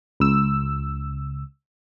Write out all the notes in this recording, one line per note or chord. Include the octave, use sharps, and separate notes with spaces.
C#2 E6